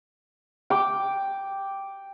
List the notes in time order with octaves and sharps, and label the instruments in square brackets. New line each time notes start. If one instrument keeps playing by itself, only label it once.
[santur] G5 D6